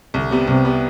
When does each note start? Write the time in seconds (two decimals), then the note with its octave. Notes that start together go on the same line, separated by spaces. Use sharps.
0.14 C2 D3
0.31 C3 G3 B3
0.47 C2 C3
0.65 C3 G3 B3